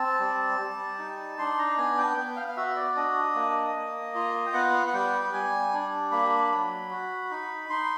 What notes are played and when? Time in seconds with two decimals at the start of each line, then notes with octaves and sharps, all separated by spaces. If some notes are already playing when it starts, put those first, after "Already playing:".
Already playing: C4 A5
0.19 G3
0.59 G3
0.99 D#4
1.39 D4 C6
1.58 A#5
1.78 B3 G#5
1.98 G5
2.17 B3 G5
2.37 F5
2.48 F5
2.57 F#4 E5
2.76 D5
2.96 D4 D#5
3.35 A#3
3.76 A#3
4.15 F4
4.46 G5
4.54 B3 F#5
4.87 F#5
4.94 G3 G5
5.33 G3 G#5
5.73 D4
6.12 A#3 B5
6.52 F#3
6.90 F#4
7.31 D#4
7.70 D#4 C6